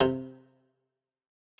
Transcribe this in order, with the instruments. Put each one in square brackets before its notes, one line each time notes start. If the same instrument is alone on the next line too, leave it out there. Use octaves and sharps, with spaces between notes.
[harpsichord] C3